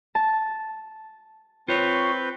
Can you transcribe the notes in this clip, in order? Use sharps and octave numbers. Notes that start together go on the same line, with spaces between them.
A5
C4 F4 B4 C#5 C#6 G6